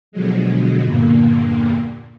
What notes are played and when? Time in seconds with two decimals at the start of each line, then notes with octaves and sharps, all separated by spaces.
0.12 B2 D3 F3 F#3 G#3
0.85 E2 G2 A#2 D3 A#3